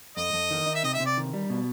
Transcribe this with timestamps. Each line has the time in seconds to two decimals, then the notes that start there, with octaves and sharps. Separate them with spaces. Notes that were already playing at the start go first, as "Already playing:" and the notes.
0.17 F2 D#5
0.33 F2
0.50 D#3
0.66 D#4
0.75 E5
0.84 C3 D#5
0.94 E5
1.00 C3
1.06 D5
1.17 D#3
1.33 G3
1.50 B2